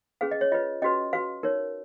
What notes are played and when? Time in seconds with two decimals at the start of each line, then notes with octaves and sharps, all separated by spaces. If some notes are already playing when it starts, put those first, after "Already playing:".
0.21 C#4 G#4 B4 F5
0.31 D#5
0.41 C#5
0.52 F4 B4 D#5
0.82 C#4 F#4 B4 D#5
1.13 F#4 B4 F5
1.43 D#4 A#4 C#5